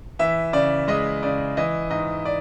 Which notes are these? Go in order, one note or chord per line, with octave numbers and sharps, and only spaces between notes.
E3 E5
C#3 D5
G#3 D#5
C#3 D5
E3 D#5
G#2 D#5
D5